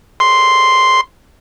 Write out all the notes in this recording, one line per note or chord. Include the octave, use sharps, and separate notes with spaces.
C6